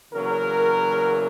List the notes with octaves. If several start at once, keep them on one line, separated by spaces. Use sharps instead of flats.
E2 C#3 F#3 A#3 A#4